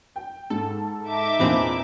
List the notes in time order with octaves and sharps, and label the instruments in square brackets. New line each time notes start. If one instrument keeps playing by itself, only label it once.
[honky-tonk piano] G5
[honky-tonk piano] G#2 [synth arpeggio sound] A4
[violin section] D#4 E5 D6
[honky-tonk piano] E2 [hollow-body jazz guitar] A#2 C4 D4 [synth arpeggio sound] F4 B4